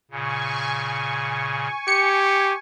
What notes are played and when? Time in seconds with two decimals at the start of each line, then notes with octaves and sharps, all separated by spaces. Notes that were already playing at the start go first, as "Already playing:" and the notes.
0.11 A#2 C#3 G#5 C#6
1.88 G4 C#7